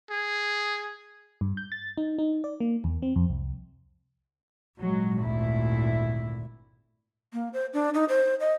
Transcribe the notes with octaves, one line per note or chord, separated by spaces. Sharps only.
G#4
G2
G6
A6
D#4
D#4
D5
A#3
E2
C4
F2
C2
G#1 A#2 F#3 G#3
D2 E4
A#3
C5
D4
D#4
C5
D#5